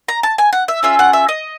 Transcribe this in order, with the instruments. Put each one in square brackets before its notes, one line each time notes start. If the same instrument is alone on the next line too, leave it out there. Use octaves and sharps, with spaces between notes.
[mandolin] A#5
A5
G#5
F#5
E5
C#4 F4 G#4 E5
F#5
E5
D#5